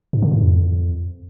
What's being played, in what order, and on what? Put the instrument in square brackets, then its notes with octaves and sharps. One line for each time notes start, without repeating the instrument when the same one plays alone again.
[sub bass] G#2
D3
A2
F2